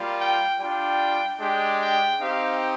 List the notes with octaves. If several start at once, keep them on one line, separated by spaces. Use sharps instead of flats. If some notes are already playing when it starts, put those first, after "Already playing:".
Already playing: G3 A#3 F4
G5
G3 D4 F4 G5
G#3 D4 G4 G5
G5
C4 D#4 G4 F5